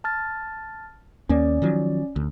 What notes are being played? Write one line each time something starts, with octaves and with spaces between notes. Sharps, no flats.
A5 F6 A6
D#2 A#3 C#4 D5
D#3 F3 F#3
D2